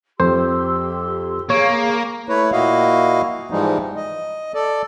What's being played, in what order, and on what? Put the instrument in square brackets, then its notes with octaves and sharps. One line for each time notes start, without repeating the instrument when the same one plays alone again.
[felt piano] F2 [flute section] G4 C6 E6 [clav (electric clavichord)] C5
[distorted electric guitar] A#3 [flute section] G#4 F5 [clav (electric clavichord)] C#5
[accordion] A3 E4 B4 C#5
A#2 A#3 E4 F#4 D#5 F5
G#2 E3 F3 G3 G#3 D#4
D#5
A4 D5